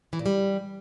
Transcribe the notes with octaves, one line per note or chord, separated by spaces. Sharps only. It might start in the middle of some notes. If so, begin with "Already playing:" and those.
E3
A#2
G3